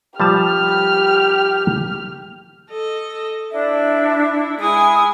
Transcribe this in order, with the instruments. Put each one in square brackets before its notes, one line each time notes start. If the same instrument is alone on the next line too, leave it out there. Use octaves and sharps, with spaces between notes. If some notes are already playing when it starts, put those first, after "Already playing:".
[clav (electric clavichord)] F3 G3 A5 [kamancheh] G4 F6
[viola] A4 D#5
[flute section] D4 E5 [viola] E4
[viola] G#3 G#5 [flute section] E4 D#6